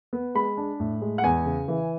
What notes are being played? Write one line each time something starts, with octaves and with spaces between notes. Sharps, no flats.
B3
G#3 B5
D4
A2
G#3
F#5
E2 G#5
C#3
E3